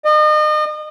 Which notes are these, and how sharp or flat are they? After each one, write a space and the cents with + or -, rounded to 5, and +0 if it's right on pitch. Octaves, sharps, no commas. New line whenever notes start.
D#5 -35